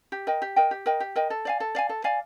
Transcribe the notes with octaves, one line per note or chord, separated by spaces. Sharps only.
G4
A#4 D#5 G5
G4
A#4 D#5 G5
G4
A#4 D#5 G5
G4
A#4 D#5 G5
A4
D5 F5 G#5
A4
D5 F5 G#5
A4
D5 F5 G#5